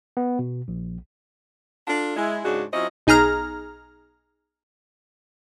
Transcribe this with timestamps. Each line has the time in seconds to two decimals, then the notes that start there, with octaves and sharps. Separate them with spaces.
0.17 B3
0.39 B2
0.68 A#1
1.88 D4 F4 A4
2.17 G#3 E4
2.45 G#2 C#3 G#3 D4 F#4
2.73 F#3 C4 C#4 E4 F4 D#5
3.07 B1 D#4 G#4 A#5 F6